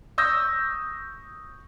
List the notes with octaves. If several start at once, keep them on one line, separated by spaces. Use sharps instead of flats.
C#6 D#6 E6 G6 A#6